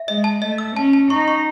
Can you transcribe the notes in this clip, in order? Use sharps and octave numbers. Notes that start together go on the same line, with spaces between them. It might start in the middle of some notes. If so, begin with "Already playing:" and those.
Already playing: E5
G#3 D#5
A5
A3 D#5
E6
C#4 A5
A5
D#4 C#6
C#6